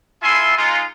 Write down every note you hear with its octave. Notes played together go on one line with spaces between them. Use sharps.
E4 F4 A4 E5 G#5 C6
G#3 D#4 F4